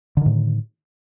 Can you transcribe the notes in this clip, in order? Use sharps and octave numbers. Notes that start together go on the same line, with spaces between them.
A2 D3 D#3